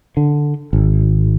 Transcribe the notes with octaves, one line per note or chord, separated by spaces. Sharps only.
D3
G#1